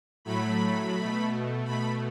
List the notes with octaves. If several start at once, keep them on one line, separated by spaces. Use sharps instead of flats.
A2 F#3 A3 B5
B2 A3
B2 A3 B5